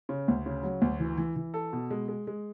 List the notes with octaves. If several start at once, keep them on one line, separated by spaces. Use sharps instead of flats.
C#3
D2
C#3
F#3
D2
E3
E3
E3
A4
B2
G#3
G#3
G#3